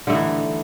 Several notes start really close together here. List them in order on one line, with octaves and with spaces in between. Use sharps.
D3 A3 D#4 E3